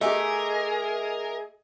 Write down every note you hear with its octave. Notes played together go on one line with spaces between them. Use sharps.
A3 G4 G#4 A#4 D#5 E5 G#5